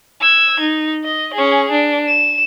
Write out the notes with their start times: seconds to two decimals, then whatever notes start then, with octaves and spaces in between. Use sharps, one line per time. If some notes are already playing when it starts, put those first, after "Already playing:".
0.21 E6 G#6
0.59 D#4
1.04 D#5
1.33 C#4 G#4
1.71 D4
2.08 E7